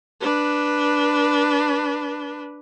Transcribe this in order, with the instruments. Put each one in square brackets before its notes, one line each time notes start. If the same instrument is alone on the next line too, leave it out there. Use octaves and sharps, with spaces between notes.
[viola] D4 B4